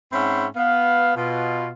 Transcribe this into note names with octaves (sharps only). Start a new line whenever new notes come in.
G#2 C4 C#4 E5 F#5 B5
B3 F5
B2 F4